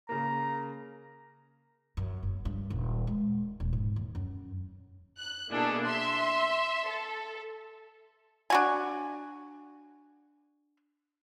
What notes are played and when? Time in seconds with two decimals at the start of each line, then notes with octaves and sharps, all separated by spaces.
0.09 C#3 A#3 A#5
1.97 F#2
2.23 F#1
2.45 G2
2.70 D#1
3.07 G#3
3.60 D#1
3.73 G#2
3.96 D#2
4.15 F#2
5.18 F#6
5.51 B2 A#3 D4 E4 G#4 A4
5.84 E5 C6
6.88 A4
8.50 D4 F#4 G#5